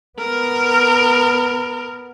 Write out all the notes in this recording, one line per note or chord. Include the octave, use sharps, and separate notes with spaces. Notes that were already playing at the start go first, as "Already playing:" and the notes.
B3 A#4